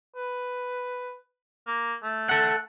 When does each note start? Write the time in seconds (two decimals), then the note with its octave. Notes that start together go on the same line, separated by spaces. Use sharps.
0.16 B4
1.67 A#3
2.03 A3
2.29 A4 F#5